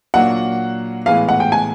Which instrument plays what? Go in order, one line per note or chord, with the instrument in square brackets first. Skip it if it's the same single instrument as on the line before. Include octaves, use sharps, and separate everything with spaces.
[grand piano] A#2 F#3 A#3 D4 [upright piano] F#5
[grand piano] A2 E3 G#3 B3 [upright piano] F5
[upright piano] F#5
G5
G#5